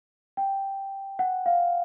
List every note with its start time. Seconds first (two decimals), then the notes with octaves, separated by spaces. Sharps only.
0.37 G5
1.19 F#5
1.46 F5